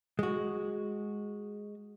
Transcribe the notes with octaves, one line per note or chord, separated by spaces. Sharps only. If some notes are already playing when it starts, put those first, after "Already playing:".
G#3 F#4